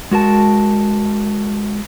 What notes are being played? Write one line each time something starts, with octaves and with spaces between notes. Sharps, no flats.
G#3 F#4 A#4 A5